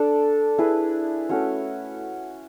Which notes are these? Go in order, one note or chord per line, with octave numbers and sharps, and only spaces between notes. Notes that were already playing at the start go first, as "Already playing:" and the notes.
Already playing: D4 A4 D5
E4 G#4 B4
A3 C#4 F#4 C#5